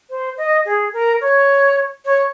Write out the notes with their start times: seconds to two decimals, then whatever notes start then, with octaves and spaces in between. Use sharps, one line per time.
0.10 C5
0.37 D#5
0.65 G#4
0.93 A#4
1.21 C#5
2.05 C#5